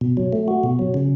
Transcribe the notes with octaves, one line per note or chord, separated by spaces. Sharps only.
B2
F#3
A3
F#4
B2
F#3
C#3